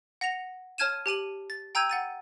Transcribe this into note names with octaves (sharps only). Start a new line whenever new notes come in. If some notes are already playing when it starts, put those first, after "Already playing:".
F#5 A#6 C#7 F7
C#5 A5 F6 G#6 D#7 E7
G4 A5 D#7 F#7
A6
G5 A#5 E6 G6 G#6 D#7
F#5 A6 D#7